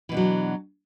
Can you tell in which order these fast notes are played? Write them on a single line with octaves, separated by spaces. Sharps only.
E3 B2 D4 F#3